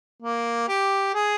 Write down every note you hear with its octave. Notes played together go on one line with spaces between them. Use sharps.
A#3
G4
G#4